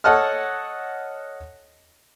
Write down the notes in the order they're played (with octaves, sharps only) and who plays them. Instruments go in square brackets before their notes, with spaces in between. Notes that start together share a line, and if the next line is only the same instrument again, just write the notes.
[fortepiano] A4 C#5 D#5 F#5 A5 F6